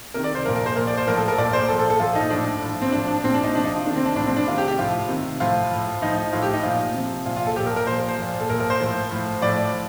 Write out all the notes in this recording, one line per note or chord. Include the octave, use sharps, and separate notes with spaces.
C3 D#3 A#4
D5
C5
A#2 F3 A#4
A#4
C5
A#2 F3 A#4
D5
C5
A2 F3 A#4
A4
A#4
A#2 F3 D5
C5
A#2 F3 A4
A4
A4
A#2 F3 F4
D#4
A2 F3 D4
A2 F3
C4
A2 F3 D4
D4
A#2 F3 C4
D4
D#4
C3 F3 D4
D#4
F4
C3 D#3 D4
C4
D4
A2 F3 D4
C4
D4
C3 D#3 F4
G4
G4
A2 F3 F4
C3 D#3
A2 F3 F4
A2 F3
A2 F3 D#4
D#4
A2 F3 F4
G4
D#4
A#2 F3 F4
C3 F3
A#2 F3 F4
F4
A4
A#2 F3 G4
A#4
A#4
A#2 F3 C5
C5
A#2 F3
A4
A#2 F3 A#4
A#4
C5
A2 F3
A2 F3
A2 F3 D5
F3